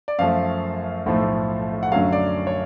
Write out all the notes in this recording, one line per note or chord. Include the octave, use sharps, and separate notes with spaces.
D5
F#2 F3 A3 F5
B1 A2 F3 A3
F#5
F#2 D3 F#3 A3 F5
D5
C#5